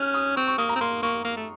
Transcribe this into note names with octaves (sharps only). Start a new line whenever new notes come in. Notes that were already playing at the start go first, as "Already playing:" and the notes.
Already playing: C#4 F6 F#6
D#6
C4 C#6
C#6
A#3 D#6
A#5
C4
A#3 C6
A#3 C#6
A#3
A3